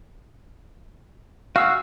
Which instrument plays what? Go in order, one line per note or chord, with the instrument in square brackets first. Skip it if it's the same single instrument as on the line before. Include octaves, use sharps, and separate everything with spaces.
[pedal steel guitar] F#4 E6 [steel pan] F5 G#5